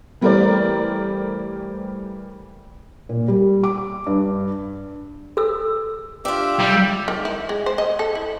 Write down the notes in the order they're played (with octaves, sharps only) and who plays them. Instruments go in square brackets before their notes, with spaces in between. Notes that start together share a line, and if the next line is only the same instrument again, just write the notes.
[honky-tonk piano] E3 G3 A3 A#4 C5 D5
[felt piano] A#2
G3
D6
G2
[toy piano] A4 E6
[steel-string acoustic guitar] D4 F4 [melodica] G4 E5
[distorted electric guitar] G3
[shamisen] D#3
E4
G#3
C5
D#5
A4
E4